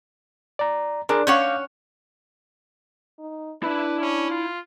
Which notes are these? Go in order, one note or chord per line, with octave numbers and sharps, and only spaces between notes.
D5 A#5
D4 G#4 A#4 C6
C#4 C#5 F5 F#5 D6 G6
D#4
D4 E4 B4 B5
C#4
F4